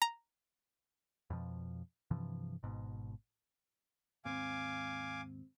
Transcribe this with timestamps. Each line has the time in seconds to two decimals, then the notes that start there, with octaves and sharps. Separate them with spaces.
0.02 A#5
1.30 F2 B2 F3
2.11 G2 C3 E3 F3
2.63 G#1 G#2 B2
4.25 D#2 G#2 C4 F5 G#5 D6